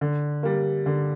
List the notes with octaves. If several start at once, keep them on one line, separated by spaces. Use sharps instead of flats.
D3
G3 A#3
D3